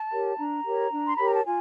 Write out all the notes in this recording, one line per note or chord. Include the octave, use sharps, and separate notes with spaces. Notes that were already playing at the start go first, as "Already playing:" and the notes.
Already playing: A5
G4 A#4 C#5
D4 A#5
G4 A#4 C#5
D4
C6
G4 A#4 C#5 B5
A#5
A5
F4 G#5